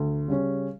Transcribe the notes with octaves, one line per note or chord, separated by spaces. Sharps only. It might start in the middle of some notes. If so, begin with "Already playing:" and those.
Already playing: D2
C#3 G3 C#4